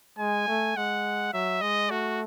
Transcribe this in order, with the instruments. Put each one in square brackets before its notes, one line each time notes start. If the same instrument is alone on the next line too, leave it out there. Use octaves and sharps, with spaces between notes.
[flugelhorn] G#3 [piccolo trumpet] G#5
[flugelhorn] A3
[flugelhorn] G#3 [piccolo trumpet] F#5
[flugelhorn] F#3 [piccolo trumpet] E5
[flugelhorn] G#3 [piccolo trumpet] D#5
[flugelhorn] A3 [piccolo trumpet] F#4